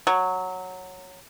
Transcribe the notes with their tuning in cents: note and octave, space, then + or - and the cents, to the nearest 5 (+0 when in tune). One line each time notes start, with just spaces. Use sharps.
F#3 -5